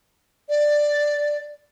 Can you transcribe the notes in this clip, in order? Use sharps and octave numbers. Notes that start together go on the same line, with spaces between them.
D5